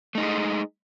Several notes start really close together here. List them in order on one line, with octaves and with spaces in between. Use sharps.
A3 D#4 G#3 G#4